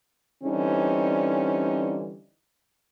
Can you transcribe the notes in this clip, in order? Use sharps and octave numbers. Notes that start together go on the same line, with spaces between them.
D3 E3 G3 C4 C#4 D#4